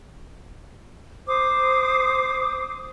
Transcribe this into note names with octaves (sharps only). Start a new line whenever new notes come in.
C5 D6 D#6